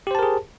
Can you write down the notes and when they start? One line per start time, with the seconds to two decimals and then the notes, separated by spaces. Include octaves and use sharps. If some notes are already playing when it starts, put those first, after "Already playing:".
0.07 G4
0.11 C5
0.15 A5
0.19 A#4
0.23 G#4